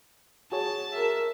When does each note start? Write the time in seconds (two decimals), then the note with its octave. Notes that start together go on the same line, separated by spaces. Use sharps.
0.52 F#4 G#4 C#5 A5
0.93 A#4 E5